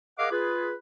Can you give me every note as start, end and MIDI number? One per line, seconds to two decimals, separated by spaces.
0.19 0.28 68
0.19 0.28 70
0.19 0.28 75
0.19 0.28 77
0.19 0.28 78
0.19 0.28 86
0.31 0.74 65
0.31 0.74 68
0.31 0.74 71